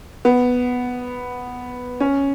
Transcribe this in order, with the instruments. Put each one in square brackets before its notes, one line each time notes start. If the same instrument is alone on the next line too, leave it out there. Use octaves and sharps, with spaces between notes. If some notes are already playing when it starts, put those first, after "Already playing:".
[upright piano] B3
C#4